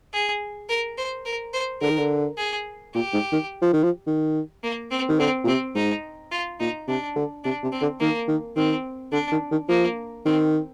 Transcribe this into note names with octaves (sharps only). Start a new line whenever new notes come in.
G#4
A#4
C5
A#4
C5
D3 A#4
D#3
D3
G#4
A#2 G4
G#2
D#3
F3
D#3
F3
D#3
A#3
C4
D#3
D3 C4
A#2
C3 C4
G#2 D#4
F4
A#2 D#4
C3 D4
D3
C3 D4
C3
C4
D3
D#3 A#3
D#3
D#3 C4
D3 D4
D#3
D#3
F3 A#3
D#3 C4